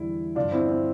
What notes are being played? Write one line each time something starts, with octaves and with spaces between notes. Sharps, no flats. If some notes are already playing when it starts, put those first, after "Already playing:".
Already playing: E2 D3 G3 E4
G2 D3 F3 D4 F4
C4 E4
C4